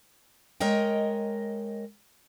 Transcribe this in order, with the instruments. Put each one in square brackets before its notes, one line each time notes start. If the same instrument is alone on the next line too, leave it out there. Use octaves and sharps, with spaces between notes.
[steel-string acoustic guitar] G#3 A#4 C#5 D#5 G5